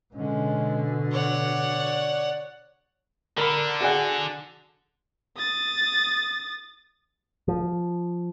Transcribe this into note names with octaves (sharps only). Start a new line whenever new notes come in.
B2 D3 G#3 C#4
C#5 D5 F#5
D3 A#4 B5
F#4 G#4 F#5
D#6 A6
F3